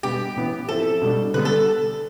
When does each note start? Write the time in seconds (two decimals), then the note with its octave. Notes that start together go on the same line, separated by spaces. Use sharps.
0.03 B2 G3 B3 D4 G4
0.36 A2 E3 B3 E4
0.68 F3 C4 E4 A4
1.02 B2 G3 D4
1.34 D3 G3 B3 B4
1.45 A4